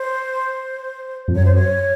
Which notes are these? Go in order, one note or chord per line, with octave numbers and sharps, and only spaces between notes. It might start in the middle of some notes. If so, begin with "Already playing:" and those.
Already playing: C5
F2
F#2 C#5
C5
C#5